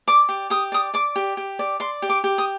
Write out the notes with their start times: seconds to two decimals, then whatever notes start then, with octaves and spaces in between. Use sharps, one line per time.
0.08 D5 D6
0.29 G4
0.50 G4 D#6
0.72 D5 D#6
0.94 D5 D6
1.16 G4
1.37 G4
1.59 D5
1.80 D5 C6
2.02 G4
2.09 D6
2.24 G4
2.38 D#6